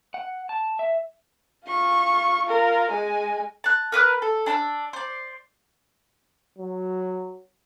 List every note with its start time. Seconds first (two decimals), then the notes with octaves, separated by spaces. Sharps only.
0.14 F#5
0.49 A5
0.79 E5
1.67 F4 C#6
2.46 F4 A#4
2.91 G#3 G#5
3.64 A5 F#6
3.92 A#4 B4 D#6 F#6
4.22 A4
4.46 D4 A5 A#5 E6
4.93 C5 D5
6.58 F#3